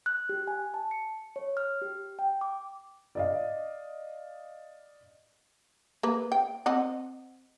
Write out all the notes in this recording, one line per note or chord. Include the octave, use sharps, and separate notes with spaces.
F#6
G4
G#5
A5
C#7
C#5
F6
G4
G5
D6
D5 D#5 F5
A#3 B4
G5
C4 D#5 F#5